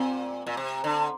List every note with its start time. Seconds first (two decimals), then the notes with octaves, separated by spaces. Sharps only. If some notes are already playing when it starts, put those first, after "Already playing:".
Already playing: A#2 C4
0.47 A#2
0.57 C3
0.84 D3